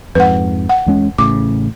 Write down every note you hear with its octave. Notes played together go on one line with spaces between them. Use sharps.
F2 G#2 B4 F#5
F#5
E2 G#3 C#4
A1 A2 C#3 D6